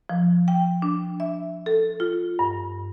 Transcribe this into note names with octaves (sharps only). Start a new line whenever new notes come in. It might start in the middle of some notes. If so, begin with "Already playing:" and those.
F3
G5
D4
E5
A4
F4
G2